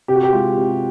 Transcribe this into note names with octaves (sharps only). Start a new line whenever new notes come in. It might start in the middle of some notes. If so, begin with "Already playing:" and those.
C3 G4
F#4
G4
G#3 F4
C3